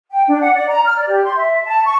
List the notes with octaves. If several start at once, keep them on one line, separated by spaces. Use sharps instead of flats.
G5
D4
F#5
D5
A#5
F6
D5
G4
C6
E5
A5
C#6